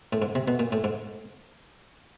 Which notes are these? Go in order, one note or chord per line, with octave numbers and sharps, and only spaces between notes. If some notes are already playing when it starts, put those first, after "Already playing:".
A2
G#2
C3
B2
A#2
A2
G#2